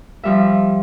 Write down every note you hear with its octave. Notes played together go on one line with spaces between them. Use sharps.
F3 G3 E5